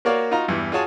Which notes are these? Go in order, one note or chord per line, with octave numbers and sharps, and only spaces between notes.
A#3 F#4 A#4 C#5 D5 F5
D#4 F4 F#4 F5 A#5
E2 G2 E3
F4 F#4 G#4 C#5 G#5 A5